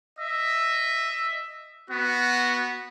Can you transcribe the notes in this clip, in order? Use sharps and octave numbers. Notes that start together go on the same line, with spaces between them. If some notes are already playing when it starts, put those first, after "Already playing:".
D#5 E5
B3 F#4